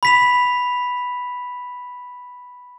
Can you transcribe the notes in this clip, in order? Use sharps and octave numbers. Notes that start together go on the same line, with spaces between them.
B5 B6 F7